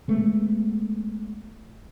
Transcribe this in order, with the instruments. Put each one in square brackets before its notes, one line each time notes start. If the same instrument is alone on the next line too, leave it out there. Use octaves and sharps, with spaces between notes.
[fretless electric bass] G#3 A3 B3